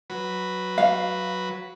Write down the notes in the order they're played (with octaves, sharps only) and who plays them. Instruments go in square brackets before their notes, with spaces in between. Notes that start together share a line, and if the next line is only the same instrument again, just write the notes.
[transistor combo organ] F#3 B4
[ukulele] F5